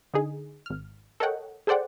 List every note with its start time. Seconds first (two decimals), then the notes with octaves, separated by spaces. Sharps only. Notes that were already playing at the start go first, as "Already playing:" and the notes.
0.14 D3 D#4 G#4
0.66 G#1 F6
1.20 A4 A#4 C#5 D#5 F#5 G5
1.67 G#4 A4 C5 D5 F#5 G5